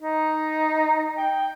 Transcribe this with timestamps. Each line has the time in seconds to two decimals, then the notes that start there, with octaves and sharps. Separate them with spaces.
0.01 D#4
1.17 G5